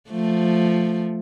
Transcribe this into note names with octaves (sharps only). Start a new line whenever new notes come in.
F3 A3